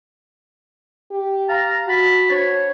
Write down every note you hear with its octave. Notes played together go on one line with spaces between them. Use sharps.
G4
F5 A5 A#5
F#4 F#5 A5 B5
D4 C5 C#5